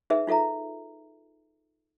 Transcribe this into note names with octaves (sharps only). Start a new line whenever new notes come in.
D#4 G#4 B4 E5
D#4 F4 A4 E5 A#5